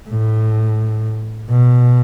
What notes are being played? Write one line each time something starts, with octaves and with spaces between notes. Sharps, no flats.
A2
B2